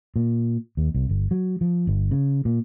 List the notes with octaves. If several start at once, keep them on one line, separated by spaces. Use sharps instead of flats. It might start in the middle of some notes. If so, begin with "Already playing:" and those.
A#2
D#2
C2
G1
F#3
F3
G1
C#3
A#2